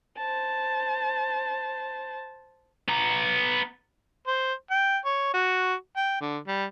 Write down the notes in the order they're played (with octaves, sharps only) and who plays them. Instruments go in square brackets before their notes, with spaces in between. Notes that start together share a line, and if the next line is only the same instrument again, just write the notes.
[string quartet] C5 A5
[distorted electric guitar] B3 A#5
[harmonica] C5
G5
C#5
F#4
G5
D3
G3